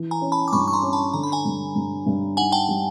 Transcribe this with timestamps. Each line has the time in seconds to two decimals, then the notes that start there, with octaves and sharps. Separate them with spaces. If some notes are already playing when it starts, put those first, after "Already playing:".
Already playing: E3
0.11 G#5 A#5
0.21 C#4
0.32 A5 B5
0.48 D6
0.53 G2 B5 C#6
0.68 C#6
0.73 A#5 C6
0.83 C#4
0.93 A5 B5
1.13 D3 A#5
1.23 B5
1.32 G#5 A#5
1.45 G2
1.76 G2
2.06 G2
2.37 D#4 F#5 G#5
2.52 G5 A5
2.69 G3